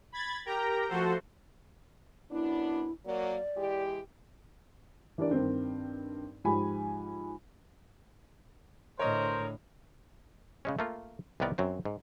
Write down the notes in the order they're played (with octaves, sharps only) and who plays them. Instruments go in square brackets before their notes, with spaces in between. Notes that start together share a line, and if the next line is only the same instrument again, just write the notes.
[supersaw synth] B5 G#6 A6
G4 A#4 G5 A#5
F3 A3 F#4 A4 C5
[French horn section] F#2 B3 D4 [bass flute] E4
[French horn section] F#3 A#3 [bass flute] D5
[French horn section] E3 G#3 G4
[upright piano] E3 D4 G4 A#4 D5
G2 D#3 C4
G#2 F3 G4 G#5 B5
[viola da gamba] A2 D3 [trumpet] A#4 [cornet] C5 [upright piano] C#5 D#5
[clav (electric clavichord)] C#3 G#3 C#4
A3 A#3 F4
C2 C3 D#3 B3 A#4 D5
F#2 F#3 C4
G#2